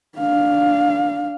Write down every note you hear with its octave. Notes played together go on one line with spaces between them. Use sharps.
D4 F5